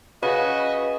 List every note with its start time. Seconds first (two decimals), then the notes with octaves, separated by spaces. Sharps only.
0.23 C#3 F#4 B4 D#5